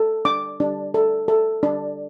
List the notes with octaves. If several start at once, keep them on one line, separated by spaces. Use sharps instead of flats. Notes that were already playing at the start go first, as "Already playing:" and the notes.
Already playing: A4
D4 D6
D4
A4
A4
D4